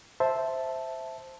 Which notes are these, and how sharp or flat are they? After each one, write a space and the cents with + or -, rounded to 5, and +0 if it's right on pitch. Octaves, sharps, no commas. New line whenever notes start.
C5 +0 E5 +0 A5 +0